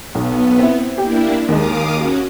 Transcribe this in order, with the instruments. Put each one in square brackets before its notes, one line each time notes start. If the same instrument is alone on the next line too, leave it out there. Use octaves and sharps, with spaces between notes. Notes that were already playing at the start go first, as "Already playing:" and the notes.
[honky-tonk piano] B1 [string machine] B3
[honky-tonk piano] C4 E4
[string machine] A#3 D4 E4 [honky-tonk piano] G4
[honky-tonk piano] D#2 G#3 [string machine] F5 D6 D#6
[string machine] C#4 F#4